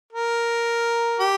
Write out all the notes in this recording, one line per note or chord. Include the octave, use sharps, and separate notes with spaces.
A#4
G4